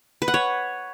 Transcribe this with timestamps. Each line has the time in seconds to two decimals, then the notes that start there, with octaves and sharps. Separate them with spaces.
0.22 B4
0.28 F#5
0.34 C#5